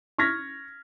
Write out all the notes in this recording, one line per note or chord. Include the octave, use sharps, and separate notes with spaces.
C#6 F6 G#6 A#6 B6